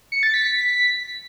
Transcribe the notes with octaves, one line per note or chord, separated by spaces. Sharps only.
C#7
A6
B6